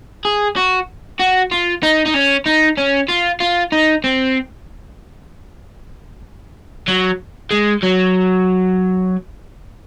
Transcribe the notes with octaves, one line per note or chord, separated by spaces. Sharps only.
G#4
F#4
F#4
F4
D#4
D#4
C#4
D#4
C#4
F4
F4
D#4
C4
F#3
G#3
F#3